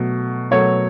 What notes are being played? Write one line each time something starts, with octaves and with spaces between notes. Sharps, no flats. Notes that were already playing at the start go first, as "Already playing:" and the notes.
Already playing: B2 F#3 A3
B2 F#3 A3 C#5